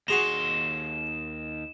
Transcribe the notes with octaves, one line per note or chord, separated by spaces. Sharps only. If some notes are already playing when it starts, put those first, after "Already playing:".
D#2 F#4 G#4 A#5 C6 E7